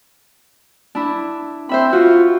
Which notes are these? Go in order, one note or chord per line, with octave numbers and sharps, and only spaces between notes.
D4 E4
C4 C5 E5 B5
F4 F#4